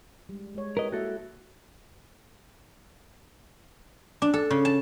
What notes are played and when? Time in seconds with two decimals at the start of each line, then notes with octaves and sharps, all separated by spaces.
0.29 G3 G#3
0.55 G#3 C#5
0.77 E4 G4 A#4 B4 D#5
0.92 A#3 E4 F#4 A4 E5
4.22 D4
4.34 A4
4.51 C#3
4.65 A5